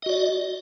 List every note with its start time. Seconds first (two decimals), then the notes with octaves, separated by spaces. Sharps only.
0.02 D#5
0.06 F#4
0.09 D5